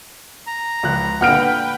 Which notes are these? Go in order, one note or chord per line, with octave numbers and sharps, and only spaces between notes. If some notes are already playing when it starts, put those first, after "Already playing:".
A#5
C#2 F3 F#6
A#2 D3 B4 F#5 G5 F6 D7